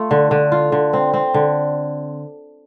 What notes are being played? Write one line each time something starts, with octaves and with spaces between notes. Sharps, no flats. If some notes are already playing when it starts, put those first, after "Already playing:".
Already playing: A3 F4
D3
D3
F4
D3
C4
C4
D3